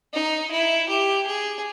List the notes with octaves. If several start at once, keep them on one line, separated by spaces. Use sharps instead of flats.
D#4
E4
G4
G#4